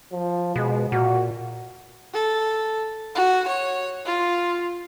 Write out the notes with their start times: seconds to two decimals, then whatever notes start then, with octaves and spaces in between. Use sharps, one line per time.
0.12 F3
0.56 B2 G#3
0.92 A#2 F#4
2.13 A4
3.15 F#4
3.48 C#5
4.06 F4